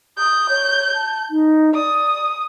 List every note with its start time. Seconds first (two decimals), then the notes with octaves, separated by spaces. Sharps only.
0.18 D#6 G6
0.49 C#5
0.95 A5
1.31 D#4
1.75 D5 D#6